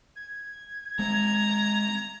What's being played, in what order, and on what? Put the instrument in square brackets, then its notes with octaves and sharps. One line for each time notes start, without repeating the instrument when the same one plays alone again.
[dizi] G#6
[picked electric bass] G#3 C4 [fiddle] A#5